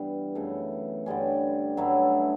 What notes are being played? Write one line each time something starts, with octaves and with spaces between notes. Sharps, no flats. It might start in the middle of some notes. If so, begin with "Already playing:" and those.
Already playing: G2 E3 G3 B3 D4
F#2 C#3 E3 A3
G2 D3 G3 C#4
G2 F#3 A3 E4